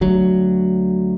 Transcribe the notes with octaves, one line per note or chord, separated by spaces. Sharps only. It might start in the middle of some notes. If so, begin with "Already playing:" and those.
D2 F#3